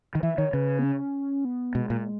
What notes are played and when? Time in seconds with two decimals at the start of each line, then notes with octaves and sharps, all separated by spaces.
0.15 D#3
0.23 E3 E5
0.38 D#3 C#5
0.53 C#3 B4
0.79 B3
0.84 C#4
1.45 B3
1.75 B2 G#3
1.90 A#2